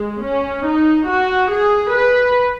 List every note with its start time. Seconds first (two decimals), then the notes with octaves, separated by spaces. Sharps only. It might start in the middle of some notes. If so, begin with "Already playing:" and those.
Already playing: G#3
0.23 C#4
0.65 D#4
1.07 F#4
1.51 G#4
1.93 B4